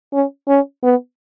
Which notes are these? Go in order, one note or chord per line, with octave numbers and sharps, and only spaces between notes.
C#4
C#4
B3